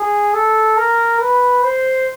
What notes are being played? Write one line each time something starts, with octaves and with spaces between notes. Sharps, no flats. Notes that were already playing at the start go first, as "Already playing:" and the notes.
Already playing: G#4
A4
A#4
B4
C5